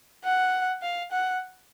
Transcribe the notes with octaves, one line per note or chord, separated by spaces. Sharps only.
F#5
F5
F#5